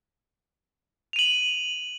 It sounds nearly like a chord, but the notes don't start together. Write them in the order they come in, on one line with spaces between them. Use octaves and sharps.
F7 D#7 F#7